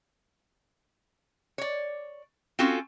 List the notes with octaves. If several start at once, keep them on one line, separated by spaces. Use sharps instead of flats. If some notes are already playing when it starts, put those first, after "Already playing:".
C#5 D5
C4 C#4 F4 F#4 A4